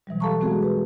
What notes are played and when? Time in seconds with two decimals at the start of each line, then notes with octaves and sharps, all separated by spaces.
0.07 B2 E3 F#3 G3
0.20 G4 A4 F5 A5 A#5 C#6
0.40 G#3 B3 C4 F#4 G#4
0.62 G4 B4